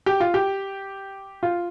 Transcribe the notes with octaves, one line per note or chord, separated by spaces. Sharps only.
G4
F4
G4
F4